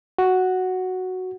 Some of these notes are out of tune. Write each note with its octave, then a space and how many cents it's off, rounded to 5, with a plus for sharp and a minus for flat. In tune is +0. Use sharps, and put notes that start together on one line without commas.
F#4 +0 F#5 +0